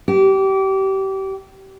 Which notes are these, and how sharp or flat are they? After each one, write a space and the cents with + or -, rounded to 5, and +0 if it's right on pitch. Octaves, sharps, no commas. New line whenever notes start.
G4 -25